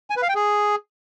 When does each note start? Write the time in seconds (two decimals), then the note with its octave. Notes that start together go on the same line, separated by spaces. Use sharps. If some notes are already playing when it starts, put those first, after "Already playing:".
0.10 G#5
0.16 B4
0.23 F5
0.29 G5
0.35 G#4